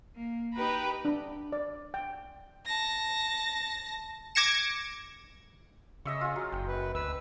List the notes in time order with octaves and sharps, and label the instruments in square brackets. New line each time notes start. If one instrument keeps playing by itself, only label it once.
[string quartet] A#3
D#4 G4 B4 A#5 B5
[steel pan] D4
D5
G5
[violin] A5 A#6
[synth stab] D6 G#6 A#6 C#7 E7
[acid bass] C#3 [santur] D#5 E5 C#6
[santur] F4 G#4
F#3
[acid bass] F#1 [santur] G5
[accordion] F#2 B4
[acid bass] D2 [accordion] B4 E6